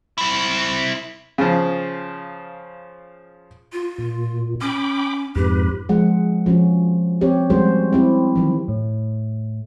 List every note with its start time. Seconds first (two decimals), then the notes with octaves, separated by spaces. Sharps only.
0.18 C4 E4
1.38 C#3 F3
3.72 F4
3.98 A#2
4.61 C#4 G5 B5 D6
5.35 F2 G#2 G4 B4
5.89 F3 G#3 F#5
6.46 F3 C#4 F#4
7.21 C4 G4 C5 C#5
7.50 F3 G3 G#3 C#4 F#4 C5
7.93 C4 E4 G4
8.35 D#3 E3 F#3
8.68 A2